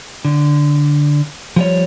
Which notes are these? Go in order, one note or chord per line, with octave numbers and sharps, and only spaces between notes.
D3
F3 G3 C#5